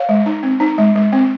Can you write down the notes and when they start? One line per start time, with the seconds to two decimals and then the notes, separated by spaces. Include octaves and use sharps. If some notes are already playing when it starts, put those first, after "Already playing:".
Already playing: C#5 F5
0.09 G#3
0.26 D#4
0.43 C4
0.60 D#4
0.78 G#3
0.96 G#3
1.13 C4